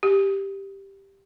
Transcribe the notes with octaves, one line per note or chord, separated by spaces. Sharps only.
G4